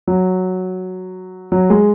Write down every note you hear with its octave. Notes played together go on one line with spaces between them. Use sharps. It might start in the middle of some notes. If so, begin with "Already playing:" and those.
F#3
F#3
G#3